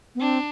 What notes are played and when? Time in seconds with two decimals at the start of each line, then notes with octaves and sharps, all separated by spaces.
0.15 B3
0.20 C4 D4